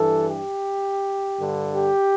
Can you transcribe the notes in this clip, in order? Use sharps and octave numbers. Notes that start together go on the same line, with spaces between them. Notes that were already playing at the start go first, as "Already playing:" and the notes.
Already playing: G2 E3 A4
G4
G2 D3
G4